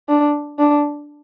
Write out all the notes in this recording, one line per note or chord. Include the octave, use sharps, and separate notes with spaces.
D4
D4